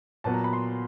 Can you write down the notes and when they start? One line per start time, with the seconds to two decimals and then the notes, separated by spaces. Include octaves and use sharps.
0.24 A#2 F#3 B3 A5
0.34 A#5
0.44 B5
0.53 C6